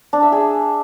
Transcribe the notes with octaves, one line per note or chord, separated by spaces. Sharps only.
D4
E5
G#4